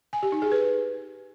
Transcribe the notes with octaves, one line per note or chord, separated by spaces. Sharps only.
G#5
G4
D#4
G#4
B4